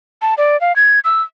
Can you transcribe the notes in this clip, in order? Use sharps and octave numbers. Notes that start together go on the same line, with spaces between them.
A5
D5
F5
G#6
E6